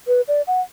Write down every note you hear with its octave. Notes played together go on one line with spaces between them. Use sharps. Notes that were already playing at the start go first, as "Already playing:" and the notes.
B4
D5
F#5